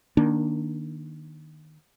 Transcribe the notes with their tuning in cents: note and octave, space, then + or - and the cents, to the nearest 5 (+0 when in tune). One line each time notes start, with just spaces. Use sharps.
D#3 -10 A#3 +15 D4 -5